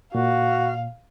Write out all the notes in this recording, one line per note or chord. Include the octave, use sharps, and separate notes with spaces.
A#2 F#4 F5